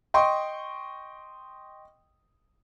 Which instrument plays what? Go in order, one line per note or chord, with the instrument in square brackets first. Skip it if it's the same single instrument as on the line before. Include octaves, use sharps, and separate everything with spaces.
[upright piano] D#5 G5 C6 C#6